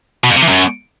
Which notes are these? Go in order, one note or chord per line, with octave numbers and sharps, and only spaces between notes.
B2
F2
C3
E2
F#2